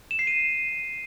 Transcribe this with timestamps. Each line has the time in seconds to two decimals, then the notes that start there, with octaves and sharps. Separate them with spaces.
0.11 E7
0.19 C7
0.27 D#7